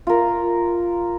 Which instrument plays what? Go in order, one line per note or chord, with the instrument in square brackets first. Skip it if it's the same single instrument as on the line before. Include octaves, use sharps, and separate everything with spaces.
[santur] F4 A#4